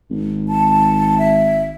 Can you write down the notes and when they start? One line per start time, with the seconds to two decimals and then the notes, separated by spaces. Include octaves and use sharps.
0.10 G#1
0.49 A5
1.19 E5